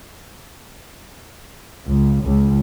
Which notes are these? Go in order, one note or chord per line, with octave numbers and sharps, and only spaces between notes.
C#2
C#2